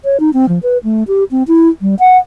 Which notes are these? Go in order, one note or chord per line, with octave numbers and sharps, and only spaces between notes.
C#5
D#4
C4
F3
B4
A3
G4
C4
E4
G3
F#5